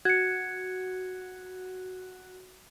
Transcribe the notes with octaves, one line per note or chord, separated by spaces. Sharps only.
F#4 G#6 C#7